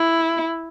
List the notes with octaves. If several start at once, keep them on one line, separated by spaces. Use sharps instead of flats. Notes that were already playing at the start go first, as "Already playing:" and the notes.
Already playing: E4